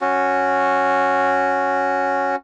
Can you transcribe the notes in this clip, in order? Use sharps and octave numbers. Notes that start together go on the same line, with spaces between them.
C#4 F#4